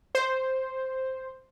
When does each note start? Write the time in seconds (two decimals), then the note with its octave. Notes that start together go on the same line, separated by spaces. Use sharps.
0.15 C5